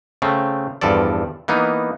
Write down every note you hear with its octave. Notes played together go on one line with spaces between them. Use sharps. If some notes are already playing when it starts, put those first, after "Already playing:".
C#3 A3 C4
E2 G2 F3 A4 D5
E3 A#3 B3 D#4